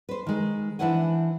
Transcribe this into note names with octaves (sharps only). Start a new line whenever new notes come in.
B4 C5
D#3 G#3
E3 D4 E4 C5 F#5 G#5